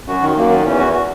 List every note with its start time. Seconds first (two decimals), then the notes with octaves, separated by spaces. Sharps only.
0.08 F#2 F#4
0.22 D#3
0.36 F#2 A#3
0.50 D#3
0.65 E2 C#4
0.79 F#4
0.93 F#4